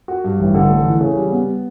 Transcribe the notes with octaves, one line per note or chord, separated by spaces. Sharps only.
F#4
G2
A1
D3
A3
E3
C#3
G3
B3